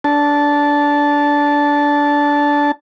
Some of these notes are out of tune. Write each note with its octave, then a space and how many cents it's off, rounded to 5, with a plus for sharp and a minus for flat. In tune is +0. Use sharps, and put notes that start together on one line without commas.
D4 -20 A5 -10